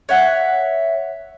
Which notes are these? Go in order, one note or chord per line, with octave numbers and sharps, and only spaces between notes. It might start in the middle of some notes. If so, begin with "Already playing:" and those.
C#5 E5 F#5